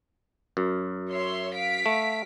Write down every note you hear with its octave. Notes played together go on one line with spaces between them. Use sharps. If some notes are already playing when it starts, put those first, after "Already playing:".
F#2
C#5 E5 C6
F5 B6 D7
A3